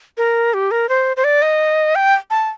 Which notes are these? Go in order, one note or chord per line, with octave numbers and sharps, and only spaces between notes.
A#4
G4
A#4
C5
C5
D5
D#5
G5
A5